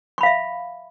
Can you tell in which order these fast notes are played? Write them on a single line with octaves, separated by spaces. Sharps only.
C#6 B5 F5 E5